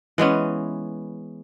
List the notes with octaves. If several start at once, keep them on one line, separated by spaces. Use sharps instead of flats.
E3 G#3 B3 C#4